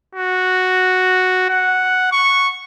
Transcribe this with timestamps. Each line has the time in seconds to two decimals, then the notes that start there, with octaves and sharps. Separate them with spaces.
0.15 F#4
1.49 F#5
2.11 C#6